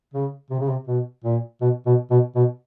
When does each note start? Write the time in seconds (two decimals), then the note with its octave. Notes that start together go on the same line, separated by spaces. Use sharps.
0.14 C#3
0.50 C3
0.60 C#3
0.69 C3
0.87 B2
1.24 A#2
1.61 B2
1.86 B2
2.11 B2
2.35 B2